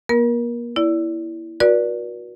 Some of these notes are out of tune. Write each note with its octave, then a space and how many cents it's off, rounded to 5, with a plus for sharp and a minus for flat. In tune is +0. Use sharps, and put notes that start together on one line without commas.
A#3 +40 A#4 +25
E4 +0 D5 -25
F#4 -25 B4 -45 D5 +0